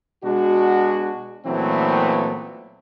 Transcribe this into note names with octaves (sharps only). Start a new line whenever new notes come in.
B2 G#3 D4 F#4
A#2 E3 F#3 A3 B3 C4